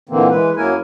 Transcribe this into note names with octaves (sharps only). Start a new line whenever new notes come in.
A#2 D3 E3 A#3 C4
E3 G#3 B4
F#2 F#3 A#3 E4 A#4 G#5